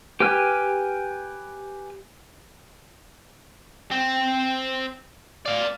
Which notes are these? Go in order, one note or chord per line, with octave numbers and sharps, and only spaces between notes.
G4 B4 G5 G#5 F6
C4
D5 F5